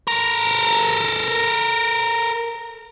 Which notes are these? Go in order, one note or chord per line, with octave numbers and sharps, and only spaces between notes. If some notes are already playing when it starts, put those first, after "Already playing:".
A4 A#4